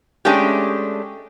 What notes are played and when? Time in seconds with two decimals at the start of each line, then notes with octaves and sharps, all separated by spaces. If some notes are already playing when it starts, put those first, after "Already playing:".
0.25 G#3 A3 C#4 D4 G4